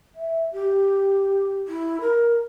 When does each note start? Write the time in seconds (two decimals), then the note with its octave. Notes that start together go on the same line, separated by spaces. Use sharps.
0.15 E5
0.53 G4
1.68 E4
2.01 A#4